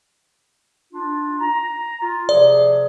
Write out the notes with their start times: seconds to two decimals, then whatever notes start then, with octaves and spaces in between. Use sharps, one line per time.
0.93 D4 D#4 F4
1.39 A#5
2.01 F4
2.29 C3 F3 G#4 D5